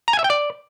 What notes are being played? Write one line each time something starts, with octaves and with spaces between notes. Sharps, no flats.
A#5
G#5
E5
G5
D5